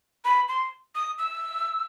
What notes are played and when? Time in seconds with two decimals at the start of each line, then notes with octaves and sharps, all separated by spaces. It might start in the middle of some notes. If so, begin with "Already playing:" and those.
0.25 B5
0.48 C6
0.95 D#6
1.18 E6